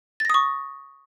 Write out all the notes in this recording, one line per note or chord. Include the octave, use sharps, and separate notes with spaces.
C#6 D#6 A6 A#6